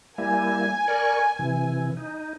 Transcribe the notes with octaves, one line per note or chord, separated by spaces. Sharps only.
G3 A#3 E4 G#5
A#4 D5 C#6
C3 E3
D#4